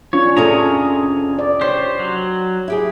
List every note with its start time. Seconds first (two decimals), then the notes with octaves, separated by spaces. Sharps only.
0.13 C#4 D4 F4 C#5
0.37 F2 C3 C#4 D4 G#4 A4 A#5
1.39 D5
1.61 G4 C5 C#5
1.99 F#3
2.68 E4 G4 G#4